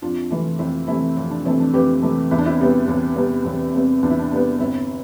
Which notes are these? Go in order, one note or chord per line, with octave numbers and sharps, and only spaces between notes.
F2 D4 F4
C3 E3 A3
F2 C4 E4
C3 E3 A3 C4 E4
F2 C4
D4
C3 E3 A3 C4
D4
F2 G4 B4
C3 E3 A3
E2 E4
D4
C4 E4
C3 G3 B3
E2 C4
C3 G3 B3
E2 C4
C3 G3 B3 C4
E2 D4
E4
D4
C3 G3 B3 D4
G1 C4 E4